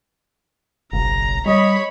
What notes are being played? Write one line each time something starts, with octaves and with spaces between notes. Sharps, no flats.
F#1 B1 A#5
G3 C#5 D#5 B5